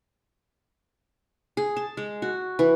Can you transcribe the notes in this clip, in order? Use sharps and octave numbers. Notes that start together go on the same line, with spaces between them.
G#4
A5
G#3
F#4
E3